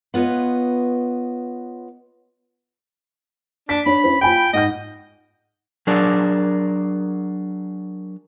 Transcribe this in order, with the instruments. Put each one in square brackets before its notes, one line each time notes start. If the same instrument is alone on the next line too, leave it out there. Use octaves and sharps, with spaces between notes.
[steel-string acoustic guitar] B3 F4 B4 C#5 D#5
[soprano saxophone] D4 [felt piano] B6
[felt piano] D4 C#5 [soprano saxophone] B5
[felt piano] C#4 E4 C5
[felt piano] F4 G#5 B5 [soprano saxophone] G5
[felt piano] G#2 F#5 G6 [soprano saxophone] D#5
[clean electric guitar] F#3 D4 G#4 A#4 D5